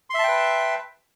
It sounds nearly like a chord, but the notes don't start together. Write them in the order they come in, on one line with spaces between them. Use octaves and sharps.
C6 E5 A5 G5 B4